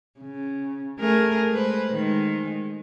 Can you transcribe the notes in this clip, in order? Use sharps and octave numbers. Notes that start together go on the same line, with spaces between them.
C#3
A3 G#4 A#4
G#3 B4 C5
D#3 G#3